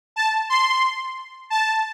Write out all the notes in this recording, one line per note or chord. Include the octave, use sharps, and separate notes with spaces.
A5
C6
A5